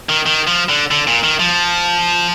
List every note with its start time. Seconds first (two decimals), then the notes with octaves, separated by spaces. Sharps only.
0.09 D#3
0.26 D#3
0.47 F3
0.69 D3
0.91 D3
1.07 A#2
1.23 D#3
1.39 F3